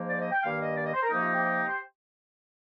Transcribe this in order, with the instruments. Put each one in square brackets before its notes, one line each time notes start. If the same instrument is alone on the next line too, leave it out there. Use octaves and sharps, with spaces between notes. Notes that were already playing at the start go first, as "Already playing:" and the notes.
Already playing: [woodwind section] G#2 F3 A#3
D5
D#5
G5
G2 D#3 A#3 F5
D#5
D5
D#5
C5
A#4
C3 F3 A#3 D#4
F4
G4
G4
C5